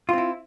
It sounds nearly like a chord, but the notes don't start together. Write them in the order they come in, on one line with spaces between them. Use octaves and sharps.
F4 C4 E4